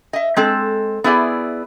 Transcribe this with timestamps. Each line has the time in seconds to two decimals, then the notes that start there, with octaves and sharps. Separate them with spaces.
0.13 D#5 E5
0.36 G#3 C4 A4
1.04 B3 E4 G#4 D5